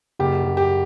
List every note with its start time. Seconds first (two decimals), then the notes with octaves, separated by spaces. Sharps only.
0.19 F#1 G4
0.44 F#1
0.57 G4